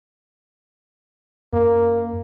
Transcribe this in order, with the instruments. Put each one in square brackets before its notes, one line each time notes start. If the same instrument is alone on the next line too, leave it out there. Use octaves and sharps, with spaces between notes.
[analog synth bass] F#2 [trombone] A#3